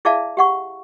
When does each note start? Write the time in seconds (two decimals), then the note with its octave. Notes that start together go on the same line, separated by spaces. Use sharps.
0.05 E4 G#4 D5 E5 F5 A5
0.37 G4 F#5 C#6